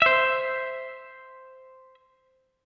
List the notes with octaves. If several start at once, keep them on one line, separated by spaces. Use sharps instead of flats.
C5 E5